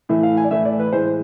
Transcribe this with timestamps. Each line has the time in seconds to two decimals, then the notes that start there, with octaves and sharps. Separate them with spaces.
0.09 A2 E3 A3 E5
0.23 F5
0.37 G#5
0.45 D5
0.51 A2 E3 A3 E5
0.65 D5
0.79 B4
0.93 A2 E3 G#3 C5